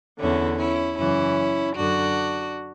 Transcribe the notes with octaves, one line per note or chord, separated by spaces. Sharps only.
E2 D3 C#4 E4
C#4 E4
F#2 C#3 E3 C#4 E4
F#2 D3 D4 F#4